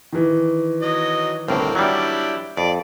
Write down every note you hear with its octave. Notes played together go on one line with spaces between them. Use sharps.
D#3 E3
F#3 D#5
G1 C2 A2 A#3 C4
F#3 G3 D4 E4 G4
F2 D5